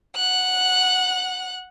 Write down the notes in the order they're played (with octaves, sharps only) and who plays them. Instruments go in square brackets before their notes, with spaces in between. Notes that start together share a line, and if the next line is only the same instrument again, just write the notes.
[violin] F#5 F#6